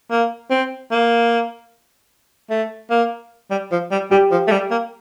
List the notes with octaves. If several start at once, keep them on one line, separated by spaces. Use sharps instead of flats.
A#3
C4
A#3
A3
A#3
G3
F3
G3
G3 G4
F3
A3
G3
A#3